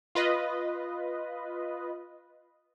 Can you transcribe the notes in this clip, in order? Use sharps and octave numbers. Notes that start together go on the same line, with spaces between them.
F4 B4 D#5